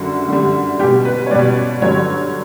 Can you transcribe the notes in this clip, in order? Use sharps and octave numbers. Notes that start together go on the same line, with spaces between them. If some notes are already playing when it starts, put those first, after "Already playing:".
Already playing: F#2 D3 G3 F#4
F#2 D3 G3
B2 G3 G4
B4
B4
C#5
B2 G3 D5
G2 D3 F#3 C#5